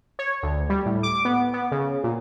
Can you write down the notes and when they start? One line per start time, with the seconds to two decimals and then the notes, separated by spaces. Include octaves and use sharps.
0.19 C#5
0.43 D2
0.70 G3
0.86 A2
1.03 D6
1.25 B3
1.54 B3
1.72 C#3
2.04 A#2